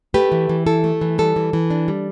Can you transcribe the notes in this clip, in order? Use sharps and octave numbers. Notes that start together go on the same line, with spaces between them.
A3 G4 B4
E3
E3
E4 A4
A3
E3
G3 A4
E3
E3
D4
G3